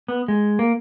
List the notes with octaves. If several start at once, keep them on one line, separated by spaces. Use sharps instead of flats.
B3
G#3
A#3